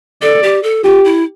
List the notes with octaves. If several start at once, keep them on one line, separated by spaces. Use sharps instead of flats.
A4 D5
G4
A4
F4 G4
E4